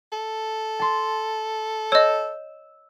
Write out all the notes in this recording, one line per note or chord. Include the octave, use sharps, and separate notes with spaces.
A4
A5 C6
C#5 D#5 E6 G6